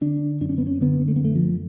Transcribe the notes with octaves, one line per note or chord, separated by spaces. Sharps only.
D3 D4
F#2 D4
C#4
B3
C#4
D3 B3
A3
B3
F#2 A3
F3